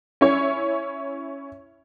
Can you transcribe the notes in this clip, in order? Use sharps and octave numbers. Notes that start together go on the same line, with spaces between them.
C#4 E4 C#5